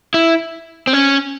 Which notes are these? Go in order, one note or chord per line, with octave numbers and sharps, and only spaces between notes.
E4
C4
C#4